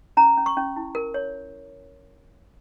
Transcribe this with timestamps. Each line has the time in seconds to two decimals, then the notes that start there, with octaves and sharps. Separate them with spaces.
0.17 C#4 A#5
0.37 C#4
0.46 C#6
0.57 C#4
0.76 E4
0.95 A#4
1.14 C#5